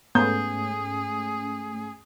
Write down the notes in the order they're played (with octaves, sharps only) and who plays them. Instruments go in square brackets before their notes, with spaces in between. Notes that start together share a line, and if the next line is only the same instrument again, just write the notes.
[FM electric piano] G#2 A3 C#4 [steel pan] B3 [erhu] G#4 [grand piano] G6